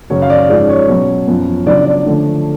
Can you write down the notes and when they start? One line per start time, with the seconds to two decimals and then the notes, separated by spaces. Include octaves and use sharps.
0.10 F#2 C#3 F#3 C#5
0.22 F5
0.30 D5
0.49 G#2 F3 G#3 C#4 F4 D5
0.69 C#5
0.88 B2 F#3 C#4
1.27 F#2 F3 B3 F4
1.66 C#3 F#3 B3 D4 F4 D5
1.85 D5
2.05 D3 F3 A3 D4